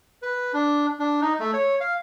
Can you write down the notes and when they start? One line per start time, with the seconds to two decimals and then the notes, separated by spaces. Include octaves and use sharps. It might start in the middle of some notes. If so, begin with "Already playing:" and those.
0.22 B4
0.53 D4
0.99 D4
1.21 D#4
1.40 A3
1.53 C#5
1.80 F5